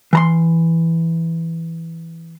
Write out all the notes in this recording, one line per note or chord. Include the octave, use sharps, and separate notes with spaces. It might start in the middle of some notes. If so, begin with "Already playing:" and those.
E3 A#5 C6